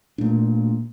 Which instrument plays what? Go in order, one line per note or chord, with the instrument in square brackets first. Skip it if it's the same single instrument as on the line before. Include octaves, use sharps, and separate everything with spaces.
[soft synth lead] A#2 [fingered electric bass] A3 D4